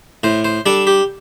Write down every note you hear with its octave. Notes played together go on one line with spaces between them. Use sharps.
A2 C5
C5
G3 D4 A4
G4